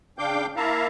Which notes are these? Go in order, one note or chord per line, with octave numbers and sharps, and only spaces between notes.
C#3 D4 F5 G5 D6 G6
A#3 E4 E5 F5 A5 A#5